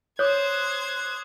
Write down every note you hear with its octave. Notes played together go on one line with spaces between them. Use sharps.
C5 C#5 D6 D#6 F#6 G#6